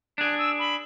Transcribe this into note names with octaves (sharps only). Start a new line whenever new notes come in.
D4 G#4 F#6
E6
B5